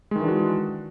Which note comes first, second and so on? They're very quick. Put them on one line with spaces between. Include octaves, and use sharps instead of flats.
G#3 D#3 E3 D4 F#4